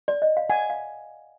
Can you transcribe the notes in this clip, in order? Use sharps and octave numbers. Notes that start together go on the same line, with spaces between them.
D5
D#5
F5
F#5 G#5
F5